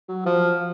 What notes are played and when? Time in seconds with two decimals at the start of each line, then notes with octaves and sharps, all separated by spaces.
0.08 F#3
0.26 F3